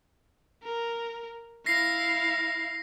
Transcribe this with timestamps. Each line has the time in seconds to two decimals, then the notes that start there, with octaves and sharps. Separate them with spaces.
0.63 A#4
1.66 E4 F5 A#6 C7